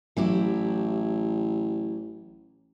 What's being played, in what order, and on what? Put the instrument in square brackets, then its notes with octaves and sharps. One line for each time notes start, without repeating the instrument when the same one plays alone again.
[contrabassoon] A1 [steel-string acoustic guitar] F#3 E4 G4